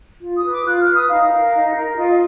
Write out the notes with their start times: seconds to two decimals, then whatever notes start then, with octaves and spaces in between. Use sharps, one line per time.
0.21 F4
0.37 D#6
0.44 B4
0.51 D6
0.65 F4 F#6
0.80 F6
0.88 B4
0.95 D#6
1.09 D#4 F5
1.31 A#4
1.53 D#4
1.75 A#4
1.97 F4 D#5
2.08 D#5